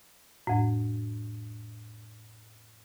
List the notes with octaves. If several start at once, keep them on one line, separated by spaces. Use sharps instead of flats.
F2 A2